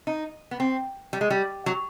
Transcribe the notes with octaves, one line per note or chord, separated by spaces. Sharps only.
D#4
B3
C4
G3
G#3
G3
F#3